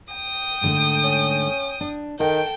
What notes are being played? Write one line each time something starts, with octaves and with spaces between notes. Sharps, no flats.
G5 D#6
G#2 D3 A3
C#4
D4
D#3 A4 G5